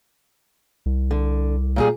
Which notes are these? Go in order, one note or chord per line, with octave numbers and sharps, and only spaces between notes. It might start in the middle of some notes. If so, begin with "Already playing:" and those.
C2
D3
A#2 G3 G#4